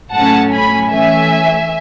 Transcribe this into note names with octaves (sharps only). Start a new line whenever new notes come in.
A2 F#3 A3 C#4 F#5 A5
G#5 B5
E3 A3 C#4 E5 G#5